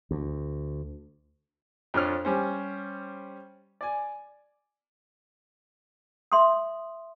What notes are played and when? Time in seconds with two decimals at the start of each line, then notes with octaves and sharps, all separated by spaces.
0.11 D2
1.94 F2 D4 F4 C#5 F6
2.25 G3 C#4 C5
3.81 D5 G#5
6.32 E5 C6 D#6